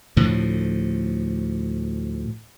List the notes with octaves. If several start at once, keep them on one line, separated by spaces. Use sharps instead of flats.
D2 A2 F3